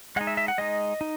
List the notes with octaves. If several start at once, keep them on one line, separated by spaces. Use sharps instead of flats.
G#3 D#4 F#5
E5
E5
F#5
G#3 D#4 D#5
D#4